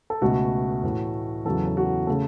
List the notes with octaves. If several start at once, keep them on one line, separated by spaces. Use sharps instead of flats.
A4
C#2 B2 A3 F#4
A2 E3 A3
E2 C#3 F#3 A4
A4
F#4
C#3 A3 A4